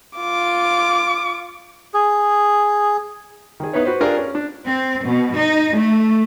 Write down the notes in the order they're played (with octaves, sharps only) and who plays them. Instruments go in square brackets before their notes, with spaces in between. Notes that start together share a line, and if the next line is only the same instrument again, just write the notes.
[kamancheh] F4 D6
[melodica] G#4
[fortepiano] D#3 G#4
B3 D#4 E4 B4 C#5
F#4 B4 C5
D4 F4 G4 G#4 A#4 D5
C#4
D4
[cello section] C4
B2
D#4
A3